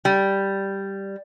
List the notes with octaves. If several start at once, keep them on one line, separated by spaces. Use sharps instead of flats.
G3